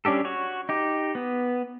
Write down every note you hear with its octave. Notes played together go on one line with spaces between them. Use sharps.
G3 C#4 D4 G4 A4
F#4 C#5
D#4 G4
B3